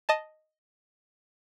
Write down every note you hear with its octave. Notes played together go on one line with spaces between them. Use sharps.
D#5 A5